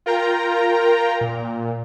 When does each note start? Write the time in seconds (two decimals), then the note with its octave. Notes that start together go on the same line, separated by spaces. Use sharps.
0.06 F4 A#4 G5 A#5
1.21 A#2